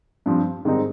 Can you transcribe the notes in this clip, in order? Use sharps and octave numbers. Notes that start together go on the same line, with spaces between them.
G2 F3 C4
G#2 D#3 G3 C4 D#4